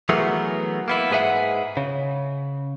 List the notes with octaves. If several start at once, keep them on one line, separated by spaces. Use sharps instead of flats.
E3 F#3 A3 B3 G#4 A#4
A#3 B3 E4
G#2 G#3 G#4 B4 E5 F#5
C#3